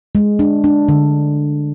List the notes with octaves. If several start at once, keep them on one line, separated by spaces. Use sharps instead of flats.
G#3
D4
D4
D3